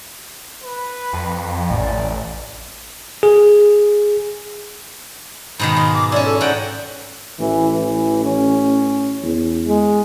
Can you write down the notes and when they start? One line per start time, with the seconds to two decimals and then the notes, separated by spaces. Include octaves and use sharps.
0.63 B4
1.13 F2
1.71 A1 D5
3.23 G#4
5.59 G#2 B2 D#3 B5
5.77 F4
5.94 D6
6.12 C#4 E4 D5
6.25 A4
6.41 G#2 D5 F#5 G5
7.40 A1 E3
7.73 E3
8.24 C#4
9.23 E2
9.68 G#3